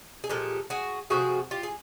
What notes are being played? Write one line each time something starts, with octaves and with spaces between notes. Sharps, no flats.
G#4
A#2 F3 G#3 G4 A4
F#4 G#4
C3 F3 A3 F#4 G#4
F4 G4
G#4